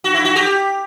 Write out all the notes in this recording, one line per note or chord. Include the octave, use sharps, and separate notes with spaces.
F#4
E4
F#4
G4